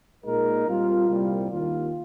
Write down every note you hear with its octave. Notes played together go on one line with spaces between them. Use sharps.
A#2 G#3 D#4 A#4
G3 C4 F4
C2 A#2 G3
D#2 D#3 A#3 F4